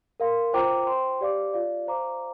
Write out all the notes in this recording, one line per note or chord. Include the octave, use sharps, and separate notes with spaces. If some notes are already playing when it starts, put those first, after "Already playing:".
A#4 F5 C6
F4 C5 G5 A#5 D6
C5 G5 C6
G4 D5 F5 D6
F4 D5 F5
C5 F5 A#5 D6